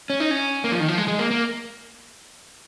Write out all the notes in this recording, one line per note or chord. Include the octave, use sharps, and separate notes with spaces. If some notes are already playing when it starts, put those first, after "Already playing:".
C#4
D#4
C#4
A#3
F3
D#3
F3
G#3
G#3
A#3
A#3